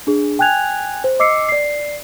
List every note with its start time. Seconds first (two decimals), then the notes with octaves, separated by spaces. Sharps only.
0.07 D4 G#4
0.39 G5 G#5 F#6 G#6 F7
1.04 C5
1.19 D#5 D6 E6 C7 C#7
1.49 D5 C7